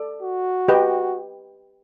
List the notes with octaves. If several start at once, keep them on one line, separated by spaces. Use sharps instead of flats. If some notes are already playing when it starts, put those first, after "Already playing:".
Already playing: A4 D5
F#4
G4 B4 D#5 G5